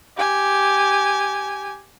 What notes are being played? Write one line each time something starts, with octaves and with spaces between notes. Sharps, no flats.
G4 G#5